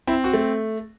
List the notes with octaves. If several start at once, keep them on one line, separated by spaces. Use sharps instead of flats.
C4 E4
F#4
A3